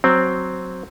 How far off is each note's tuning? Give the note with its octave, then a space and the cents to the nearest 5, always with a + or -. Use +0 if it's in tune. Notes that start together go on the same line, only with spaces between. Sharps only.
F#3 +0 C4 +0